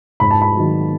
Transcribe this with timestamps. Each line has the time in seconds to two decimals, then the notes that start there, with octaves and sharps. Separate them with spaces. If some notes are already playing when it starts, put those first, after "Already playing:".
0.20 G#2 B5
0.31 A5
0.42 B5
0.56 D#3 F#3